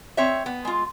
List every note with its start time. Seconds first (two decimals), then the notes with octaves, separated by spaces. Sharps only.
0.17 C4 C#5 E5
0.46 B3
0.65 G#3 F4